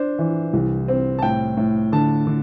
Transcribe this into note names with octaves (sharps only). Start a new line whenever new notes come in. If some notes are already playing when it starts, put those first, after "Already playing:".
Already playing: D4 C5
E3
C2
C4
A5
A2 G5
A2
D3 A5
D3